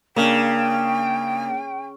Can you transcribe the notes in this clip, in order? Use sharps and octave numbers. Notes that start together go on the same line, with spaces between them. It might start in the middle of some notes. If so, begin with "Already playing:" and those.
C#3 A#3 D4 G5